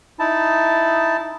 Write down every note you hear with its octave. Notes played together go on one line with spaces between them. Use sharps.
D#4 E4 A5